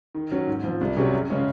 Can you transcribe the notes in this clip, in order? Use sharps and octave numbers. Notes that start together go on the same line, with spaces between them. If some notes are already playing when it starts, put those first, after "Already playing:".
D#3
F#3 C#4
G#2
F3 C4 F4
C2
C3 F#3 C#4 G#4
F#2
C#3 G#3 C#4